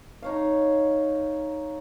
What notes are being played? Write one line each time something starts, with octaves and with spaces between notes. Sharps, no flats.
D#4 C#5 F5